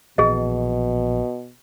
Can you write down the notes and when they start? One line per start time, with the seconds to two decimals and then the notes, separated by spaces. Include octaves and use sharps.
0.18 A#1 B2 E3 G#4 D#5